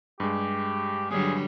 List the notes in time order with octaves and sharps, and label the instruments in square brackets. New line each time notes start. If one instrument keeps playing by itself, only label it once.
[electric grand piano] G2 G#3 [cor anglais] G4
[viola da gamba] D3 F#3 G3 [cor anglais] G#4